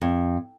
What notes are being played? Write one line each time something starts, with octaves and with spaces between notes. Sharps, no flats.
F2